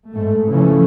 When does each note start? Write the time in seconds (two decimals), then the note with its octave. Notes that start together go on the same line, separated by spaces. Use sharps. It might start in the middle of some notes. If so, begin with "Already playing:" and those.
0.10 G#2 A3
0.49 C#3 E3 F3 A3 C#4